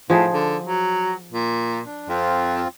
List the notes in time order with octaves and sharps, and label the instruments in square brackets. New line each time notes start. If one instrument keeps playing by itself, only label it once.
[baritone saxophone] A2 [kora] F3 D#4 G#4
[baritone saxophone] D3
F#3
A#2
[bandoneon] D4
[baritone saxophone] F2 [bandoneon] C4 F4